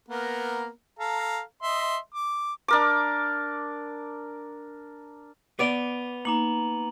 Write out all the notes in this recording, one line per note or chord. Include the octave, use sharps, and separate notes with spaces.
A#3 B3 A#4
A4 F5 A#5
D#5 E5 C6
D6
D4 A#4 D6
B3 D5 D6 F7 G7
A#3 D#4 A#5 D6 F#7